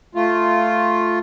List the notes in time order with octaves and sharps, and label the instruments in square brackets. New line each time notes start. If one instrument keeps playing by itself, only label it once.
[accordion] A3 F4